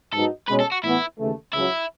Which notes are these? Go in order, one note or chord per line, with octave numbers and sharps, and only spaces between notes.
G#2 F#3 B3 D#4 F#4 A4
B2 G#3 C#4 B4
A4
F#4
A2 E3 B3 E4
D#2 C#3 E3 A3
C#2 C#3 F#3 E4